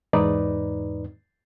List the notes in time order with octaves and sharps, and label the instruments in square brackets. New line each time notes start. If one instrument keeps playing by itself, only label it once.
[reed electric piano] E2 G#2 D#4 B4 D5